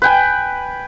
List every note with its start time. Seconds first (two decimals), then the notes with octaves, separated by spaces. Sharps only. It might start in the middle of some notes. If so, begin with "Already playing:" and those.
0.02 B4 G5 G#5